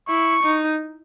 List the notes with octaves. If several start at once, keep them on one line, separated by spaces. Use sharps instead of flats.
E4 C#6
D#4